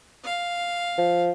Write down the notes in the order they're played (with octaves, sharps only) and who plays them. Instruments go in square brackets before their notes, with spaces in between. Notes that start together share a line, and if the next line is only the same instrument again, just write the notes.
[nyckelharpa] F5
[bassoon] F3